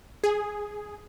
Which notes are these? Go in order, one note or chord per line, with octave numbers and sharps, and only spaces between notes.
G#4